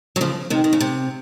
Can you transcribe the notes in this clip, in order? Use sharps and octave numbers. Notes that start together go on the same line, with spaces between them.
F#3
C#3 F3
C3 D#3
D#3
C#3
C3